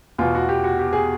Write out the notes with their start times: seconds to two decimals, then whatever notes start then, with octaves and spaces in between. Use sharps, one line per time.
0.18 E2 B2 F4
0.35 F#4
0.49 G4
0.64 F#4
0.79 G4
0.93 G#4